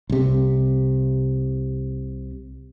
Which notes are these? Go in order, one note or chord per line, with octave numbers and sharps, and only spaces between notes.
C2 C3